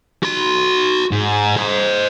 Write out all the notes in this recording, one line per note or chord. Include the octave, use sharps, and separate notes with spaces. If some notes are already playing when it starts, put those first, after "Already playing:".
F#4 C6
G#2
C5 D#5